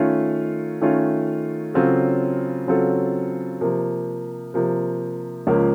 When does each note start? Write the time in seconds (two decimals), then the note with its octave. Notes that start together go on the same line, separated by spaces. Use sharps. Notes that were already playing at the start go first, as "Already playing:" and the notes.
Already playing: D#3 A3 C#4 F4
0.81 D#3 A3 C#4 F4
1.74 C#3 F#3 C4 F4 A4
2.67 C#3 F#3 C4 F4 A4
3.61 C3 F3 A#3
4.54 C3 F3 A#3
5.47 C#2 C#3 F3 A#3